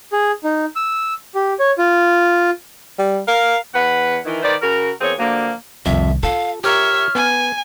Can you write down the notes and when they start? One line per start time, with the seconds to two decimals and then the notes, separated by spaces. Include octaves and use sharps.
0.13 G#4
0.44 D#4
0.76 E6
1.35 G4
1.59 C#5
1.79 F4
2.99 G3
3.28 A#4 F5
3.75 E2 B4 F#5
4.25 D#3 E3
4.43 D#3 B4 C5 D5
4.62 C#3 F#4 A#4
5.01 E2 A#3 C4 G#4 C#5
5.18 D3 F3 F#3 A#3
5.86 C2 F2 D#3 E5
6.23 F4 A4 F5
6.64 G4 A#4 C#5 E5 F6
7.15 B3 G#5